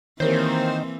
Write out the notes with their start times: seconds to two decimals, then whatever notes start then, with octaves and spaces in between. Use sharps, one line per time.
0.20 D#3 E3 A#3 C4 G4 A#4 C5 C#5